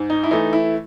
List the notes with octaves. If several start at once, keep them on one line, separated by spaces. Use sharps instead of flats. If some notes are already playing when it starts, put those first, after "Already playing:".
Already playing: G#2
D#4
E4
E3 A3 D#4
E4